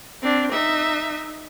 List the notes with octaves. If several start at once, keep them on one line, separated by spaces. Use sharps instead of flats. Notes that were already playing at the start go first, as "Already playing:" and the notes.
C4 D4
D#4 E5